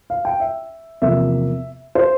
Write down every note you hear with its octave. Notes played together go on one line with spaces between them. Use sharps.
F5
G5
E5
E2 C3 F3 A#3 E5
C5